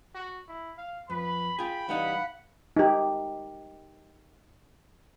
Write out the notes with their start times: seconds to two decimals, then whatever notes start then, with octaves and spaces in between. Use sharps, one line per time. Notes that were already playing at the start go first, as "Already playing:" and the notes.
0.15 F#4
0.48 E4
0.78 F5
1.10 F2 B4 B5
1.59 F4 G#4 G5 B5
1.89 E3 G3 D#4 F5 F#5
2.76 D#4 G4